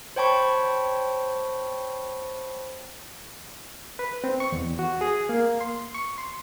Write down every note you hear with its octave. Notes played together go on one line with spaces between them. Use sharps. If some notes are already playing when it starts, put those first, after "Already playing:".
C5 C#5 G5 A5 B5 C#6
B4
C4
C#6
E2
F#4
G#4
A#3
C6
C#6
C6